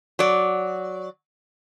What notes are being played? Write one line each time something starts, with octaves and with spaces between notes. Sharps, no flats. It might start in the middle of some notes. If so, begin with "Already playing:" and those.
F#3 D5